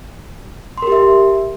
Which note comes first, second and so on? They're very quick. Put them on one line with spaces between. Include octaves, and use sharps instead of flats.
C6 A#4 G4 E5